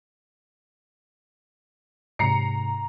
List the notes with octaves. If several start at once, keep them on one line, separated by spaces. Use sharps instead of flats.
G#2 C3 A#5 C7 C#7